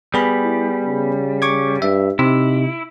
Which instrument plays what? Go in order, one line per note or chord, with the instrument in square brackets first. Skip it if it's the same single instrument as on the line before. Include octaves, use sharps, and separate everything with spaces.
[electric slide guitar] G3 [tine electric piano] B3 G#4 B5
[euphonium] E4
C#3
[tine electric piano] C#6 D6 G#6
[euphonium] G2 [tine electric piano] E5
[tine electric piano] C3 [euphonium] D#4 [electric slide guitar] E4